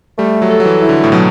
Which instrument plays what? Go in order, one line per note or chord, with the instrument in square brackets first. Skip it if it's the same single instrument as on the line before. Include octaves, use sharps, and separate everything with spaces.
[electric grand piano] G3 [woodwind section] A3
[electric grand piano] F#3
[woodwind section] A4
[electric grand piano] F#3
E3
[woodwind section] E4
[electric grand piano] D3
A2
[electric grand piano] B2 [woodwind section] F#3